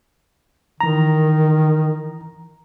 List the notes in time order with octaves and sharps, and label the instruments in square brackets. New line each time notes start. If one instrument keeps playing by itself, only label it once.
[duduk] D#3 [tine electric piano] E3 A#5